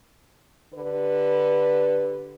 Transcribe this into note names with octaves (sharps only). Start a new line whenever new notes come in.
D3 G4 B4